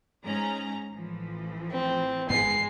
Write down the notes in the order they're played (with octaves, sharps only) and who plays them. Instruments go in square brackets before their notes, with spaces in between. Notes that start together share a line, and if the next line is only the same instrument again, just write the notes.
[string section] G#2 C#4 A#5
A1 E3 F3
[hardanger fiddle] C4
[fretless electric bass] G1 G#2 B3 [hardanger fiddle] G#3 [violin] C7